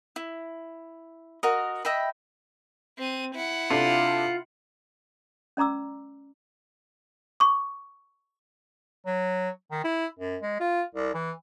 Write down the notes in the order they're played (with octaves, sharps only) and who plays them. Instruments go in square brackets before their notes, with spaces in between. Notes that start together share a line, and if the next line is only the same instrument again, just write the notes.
[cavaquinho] E4
F#4 A#4 D#5
D#5 E5 G5 B5
[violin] C4 D#7
E4 F#5
[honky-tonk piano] C3 D4 A4 [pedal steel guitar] F4
[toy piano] C#4 D5 A#5 D6 E6
[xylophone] C#6 D6
[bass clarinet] F#3
D#3
E4
F#2
G#3
F4
C2
E3